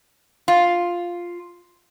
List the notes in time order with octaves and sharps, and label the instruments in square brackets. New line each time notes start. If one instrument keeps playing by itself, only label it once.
[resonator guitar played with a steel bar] F4